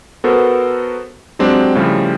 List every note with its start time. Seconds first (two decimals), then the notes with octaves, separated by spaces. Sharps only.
0.24 B3 F#4 A4 A#4 C5
1.39 F#3 G#3 C4 D4 G4
1.75 A2 C#3 F3 G3